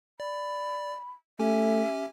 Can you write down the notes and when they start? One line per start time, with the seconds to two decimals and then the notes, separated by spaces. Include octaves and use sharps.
0.20 D5 B5
1.40 A3 C#4 G4 E5 G#5